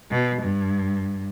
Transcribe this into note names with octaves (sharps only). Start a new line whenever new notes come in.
B2
G2